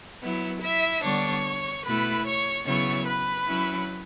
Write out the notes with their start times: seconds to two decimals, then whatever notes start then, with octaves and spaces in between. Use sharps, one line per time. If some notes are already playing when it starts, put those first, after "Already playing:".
0.22 F#3 B3 E4
0.62 E4 E5
1.03 D3 G3 B3 D4 C#5 C#6
1.84 B2 A3 E4 B4 B5
2.25 C#5 C#6
2.66 C#3 F#3 B3 E4 C#5 C#6
3.07 B4 B5
3.48 F#3 C#4 E4